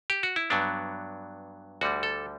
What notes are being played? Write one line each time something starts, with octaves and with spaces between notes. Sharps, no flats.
G4
F#4
E4
G2 F#3 B3 D4
D2 D3 G3 F#4
A4